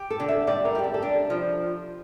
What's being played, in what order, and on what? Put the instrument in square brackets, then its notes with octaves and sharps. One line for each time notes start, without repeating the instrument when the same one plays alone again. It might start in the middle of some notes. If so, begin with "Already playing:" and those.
Already playing: [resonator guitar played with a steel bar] G4
[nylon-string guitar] A4
[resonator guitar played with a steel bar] D3
[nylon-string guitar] E5
[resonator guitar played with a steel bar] G3 [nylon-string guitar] D5
[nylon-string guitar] A#4
[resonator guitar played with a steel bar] G3 [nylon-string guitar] G4
[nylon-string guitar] A4
A4
[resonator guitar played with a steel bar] D4 [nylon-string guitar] G4
[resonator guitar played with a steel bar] F3